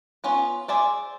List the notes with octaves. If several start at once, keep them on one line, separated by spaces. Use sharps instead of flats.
B3 C#4 F4
G#4 C5 D5 E5